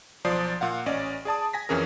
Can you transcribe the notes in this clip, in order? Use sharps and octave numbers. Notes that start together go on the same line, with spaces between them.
B1 F3 D5 D#6 C7
A#2 F5 F#5
A1 C#4 D5 D#5
G#4 D5 A5 D#6
G#5 A#6 B6
F2 E3 C#4 G#4 A#4